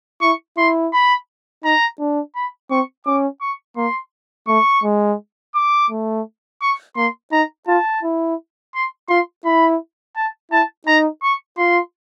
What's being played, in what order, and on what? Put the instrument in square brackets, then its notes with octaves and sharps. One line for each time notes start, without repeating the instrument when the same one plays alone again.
[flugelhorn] E4 [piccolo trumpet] C#6
[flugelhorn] E4 [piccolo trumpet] C6
[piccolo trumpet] B5
[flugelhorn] D#4 [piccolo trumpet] A#5
[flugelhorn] D4
[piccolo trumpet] B5
[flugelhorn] C4 [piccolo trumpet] C#6
[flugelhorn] C#4 [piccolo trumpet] D6
[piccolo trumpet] C#6
[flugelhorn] A#3 [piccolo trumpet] C6
[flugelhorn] A3 [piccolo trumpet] C#6
[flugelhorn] G#3
[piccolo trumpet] D6
[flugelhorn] A3
[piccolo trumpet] C#6
[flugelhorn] A#3 [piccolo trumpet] C6
[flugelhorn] D#4 [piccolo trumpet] A#5
[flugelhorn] F4 [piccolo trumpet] A5
[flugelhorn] E4
[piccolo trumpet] C6
[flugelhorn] F4 [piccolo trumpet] C6
[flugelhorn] E4 [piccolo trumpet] B5
[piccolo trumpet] A5
[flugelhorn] E4 [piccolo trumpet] A5
[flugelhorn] D#4 [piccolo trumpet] A#5
[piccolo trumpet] C#6
[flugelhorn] F4 [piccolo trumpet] C6